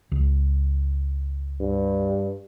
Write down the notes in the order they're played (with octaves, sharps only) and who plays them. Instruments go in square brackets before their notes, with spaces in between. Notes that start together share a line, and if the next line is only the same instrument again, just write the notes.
[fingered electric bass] C#2
[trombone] G2